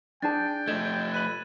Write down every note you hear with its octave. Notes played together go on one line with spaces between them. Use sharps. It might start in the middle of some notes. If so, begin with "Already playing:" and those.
D4 G#4 G5 A5 A6
F3 A3 D#5 G#6 E7
B4 F#6 D#7 F#7